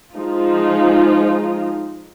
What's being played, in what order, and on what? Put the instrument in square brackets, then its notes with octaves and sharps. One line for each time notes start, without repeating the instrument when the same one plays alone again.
[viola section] F3 G#3 D#4 F4